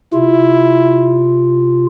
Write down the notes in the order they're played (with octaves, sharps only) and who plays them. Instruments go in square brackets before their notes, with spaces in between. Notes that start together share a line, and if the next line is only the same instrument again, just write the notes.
[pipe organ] C3 F4 [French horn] E4